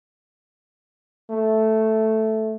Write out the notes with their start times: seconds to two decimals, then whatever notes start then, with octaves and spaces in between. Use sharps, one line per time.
1.30 A3